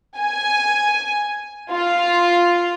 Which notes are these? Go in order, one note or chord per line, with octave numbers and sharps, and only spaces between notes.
G#5
F4